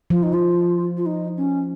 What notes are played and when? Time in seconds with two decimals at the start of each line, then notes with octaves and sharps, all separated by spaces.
0.10 F3 F4
0.22 D#4
0.33 F4
0.97 F4
1.05 D#4
1.37 C#4